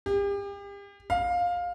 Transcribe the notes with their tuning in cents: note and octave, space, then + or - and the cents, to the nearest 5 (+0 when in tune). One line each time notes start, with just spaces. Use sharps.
G4 +40
F5 +15